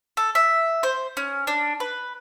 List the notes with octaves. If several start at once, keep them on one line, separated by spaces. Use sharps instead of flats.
A4
E5
C5
C#4
D4
B4